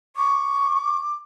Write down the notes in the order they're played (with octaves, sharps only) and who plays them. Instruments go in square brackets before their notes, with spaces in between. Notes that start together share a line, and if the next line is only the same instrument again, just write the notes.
[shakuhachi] C#6 [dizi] D6